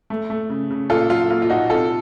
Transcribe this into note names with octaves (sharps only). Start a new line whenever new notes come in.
A3
A3
C#3
C#3
A#2 F4 A4
F#3 F4
A#3 F4
F4
A#2 D#4 F#4
C3 F4 A4